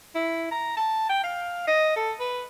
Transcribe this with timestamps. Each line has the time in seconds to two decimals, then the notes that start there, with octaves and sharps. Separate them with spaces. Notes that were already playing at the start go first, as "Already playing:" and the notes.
0.15 E4
0.51 A#5
0.77 A5
1.09 G5
1.24 F5
1.67 D#5
1.96 A4
2.20 B4